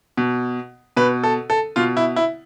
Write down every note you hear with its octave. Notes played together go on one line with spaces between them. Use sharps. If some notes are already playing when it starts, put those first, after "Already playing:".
B2
B2 B4
A4
A4
B2 F4
E4
E4